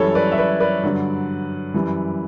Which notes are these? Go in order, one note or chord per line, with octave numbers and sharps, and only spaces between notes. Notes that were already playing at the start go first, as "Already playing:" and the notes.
Already playing: F#2 E3 G3 A4 C#5
B4 D5
E5
B4 D5
B4 D5
G2 D3 F#3
F#2 E3 G3